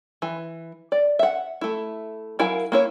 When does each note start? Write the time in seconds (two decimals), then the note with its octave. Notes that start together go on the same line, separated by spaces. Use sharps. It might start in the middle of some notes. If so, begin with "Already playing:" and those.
0.22 E3
0.92 D5
1.19 E5 F#5
1.61 A3 E4
2.39 F#3 E4 A#4 F5 G#5
2.72 A#3 E4 C#5